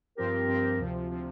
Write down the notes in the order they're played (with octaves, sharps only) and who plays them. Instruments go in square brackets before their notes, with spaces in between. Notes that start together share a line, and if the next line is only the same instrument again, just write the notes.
[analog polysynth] G2 F3 C4 G4 [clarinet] A#4
[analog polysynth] G2 F3 C4 G4
D2 C3 F3
C3 F3